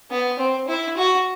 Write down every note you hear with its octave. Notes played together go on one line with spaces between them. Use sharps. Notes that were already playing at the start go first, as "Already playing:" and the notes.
B3
C4
E4
F#4